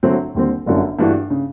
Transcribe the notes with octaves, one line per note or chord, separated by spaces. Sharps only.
D3 F#3 A3 C4
D#2 D3 G3 C4
G1 F#2 D3 F#3 A3
G2 E3 A3 D4 F#4
C#3